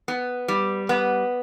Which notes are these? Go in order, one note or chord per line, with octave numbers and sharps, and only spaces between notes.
B3
G3
B3